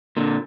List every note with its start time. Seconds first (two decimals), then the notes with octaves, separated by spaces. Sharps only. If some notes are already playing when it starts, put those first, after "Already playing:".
0.17 A#2 D3